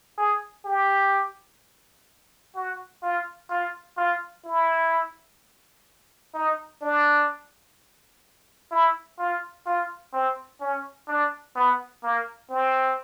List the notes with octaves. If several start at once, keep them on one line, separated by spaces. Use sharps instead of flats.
G#4
G4
F#4
F4
F4
F4
E4
D#4
D4
E4
F4
F4
C4
C#4
D4
B3
A#3
C4